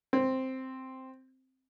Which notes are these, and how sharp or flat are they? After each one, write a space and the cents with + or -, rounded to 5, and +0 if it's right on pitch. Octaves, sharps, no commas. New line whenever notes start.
C4 +0